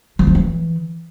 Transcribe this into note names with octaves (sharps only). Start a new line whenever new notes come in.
F3
A3
E3